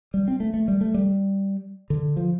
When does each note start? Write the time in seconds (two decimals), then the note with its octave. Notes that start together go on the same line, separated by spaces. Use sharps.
0.14 G3
0.28 C4
0.40 A3
0.54 A3
0.68 G3
0.81 A3
0.94 G3
1.90 D3
2.16 F3